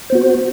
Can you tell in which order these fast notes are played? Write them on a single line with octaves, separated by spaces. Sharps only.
C5 B3 F#4